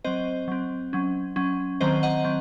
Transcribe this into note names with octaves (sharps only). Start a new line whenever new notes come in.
F#3 C4 C5 D#5
F#3 C4
F#3 C#4
F#3 C#4
D#3 F#3 C4 C5 D#5
D#5 F#5
F#3 C4